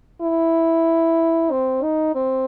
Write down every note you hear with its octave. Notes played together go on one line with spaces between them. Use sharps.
E4
C4
D#4
C4